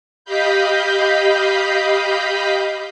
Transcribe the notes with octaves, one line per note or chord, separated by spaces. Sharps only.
G4 D#5 F5 B5 G6